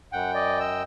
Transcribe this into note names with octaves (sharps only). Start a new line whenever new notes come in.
F#2 F#5 G5
D5 D#5
D#5 E6